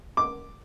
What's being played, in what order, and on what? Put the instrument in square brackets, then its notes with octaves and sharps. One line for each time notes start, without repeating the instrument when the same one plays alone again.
[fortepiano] D6